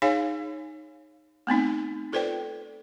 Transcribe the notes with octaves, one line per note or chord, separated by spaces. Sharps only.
D#4 G#4 C#5 F5 G#5
A3 B3 C4 D#4
F4 A4 B4 C5 D5 G5